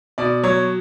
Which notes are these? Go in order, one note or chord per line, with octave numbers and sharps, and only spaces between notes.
B2 D5
F#3 C#5